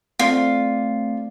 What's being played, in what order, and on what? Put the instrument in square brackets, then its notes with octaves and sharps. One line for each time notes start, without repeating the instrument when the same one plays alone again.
[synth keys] A3 C4 D5 [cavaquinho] F4